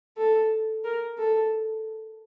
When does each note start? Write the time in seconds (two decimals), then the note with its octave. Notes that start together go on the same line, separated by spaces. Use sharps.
0.17 A4
0.84 A#4
1.18 A4